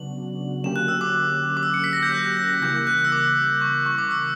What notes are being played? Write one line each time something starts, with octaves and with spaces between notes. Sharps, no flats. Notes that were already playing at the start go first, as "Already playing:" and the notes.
Already playing: C#3 F#3 B3 D4 F#4 F#7
D3 F#3 A#3 C#4 G4 E7
F#6
E6
D6
D6
E6
C#7
B6
A#6
G6
F#6
A#6
C#3 E3 G3 A#3 G6
F#6
E6
D6
C#6
C#6
D6
E6